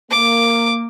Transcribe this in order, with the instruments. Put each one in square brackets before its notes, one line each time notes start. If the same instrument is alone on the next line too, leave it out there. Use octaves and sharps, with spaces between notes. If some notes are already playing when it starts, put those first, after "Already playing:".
[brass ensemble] A#3 [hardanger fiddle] D6